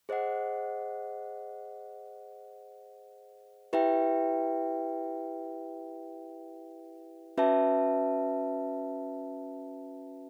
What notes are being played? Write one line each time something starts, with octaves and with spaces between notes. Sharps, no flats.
G#4 C5 D#5 F#5
E4 G4 B4 E5 G5
C#4 F#4 B4 E5 A5